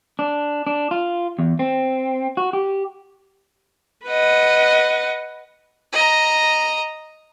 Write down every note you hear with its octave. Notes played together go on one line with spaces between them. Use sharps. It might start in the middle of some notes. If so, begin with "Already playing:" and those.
D4
D4
F4
E2
C4
F#4
G4
B4 D#5 F#5
D#5 A#5